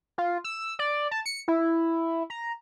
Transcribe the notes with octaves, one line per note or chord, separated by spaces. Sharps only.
F4
E6
D5
A5
C#7
E4
A#5